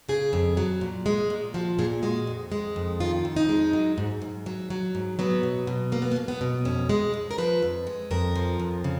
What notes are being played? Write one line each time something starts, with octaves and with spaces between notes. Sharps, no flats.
C#3 G#4
F2
F#3
A#2
G#3
A#2
F3 F#4
A#2 G#4
G#3 F#4
F2
G#3
F2
D#3 F4
F2
D#4
G#3
F#3
G#2
G#2
F#3
F#3
G#2
F#3 B3
B2
B2
F#3 A#3
B3
A#3
F#3
B3
B2
F2 C#4
G#3
F2
A#4
F3 B4
F2
G#3
F2 A#4
F3
F2
C#3